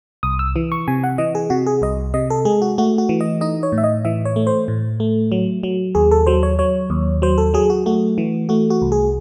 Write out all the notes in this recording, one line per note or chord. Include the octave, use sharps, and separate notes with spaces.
C2 D#6
E6
E3
C#6
C3 G#5
F#5
E3 D#5
G#4
C3 F#4
G#4
C2 D#5
C3 D#5
A4
G#3 G#4
F#4
A3 F#4
F#4
E3
D#5
D#4 D#5
C#5
A2
E5
D#5
E3 E5
C#5
A3
C5
A2
A3
F#3
F#3
D#2 G#4
A4
F#3 C5
C#5
F#3 C#5
D#2
F#3 C5
A4
F#3 G#4
F#4
A3 F#4
E3
A3 F#4
F#4
C2
G#4